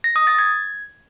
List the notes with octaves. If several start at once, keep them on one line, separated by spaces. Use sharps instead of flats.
A#6
D#6
A6
G#6